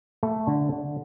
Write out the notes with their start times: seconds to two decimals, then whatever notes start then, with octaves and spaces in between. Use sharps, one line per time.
0.23 A3
0.47 D3
0.72 D3